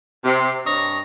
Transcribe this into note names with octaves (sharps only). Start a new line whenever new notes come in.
C3
G2 D4 C#5 D#5 A#5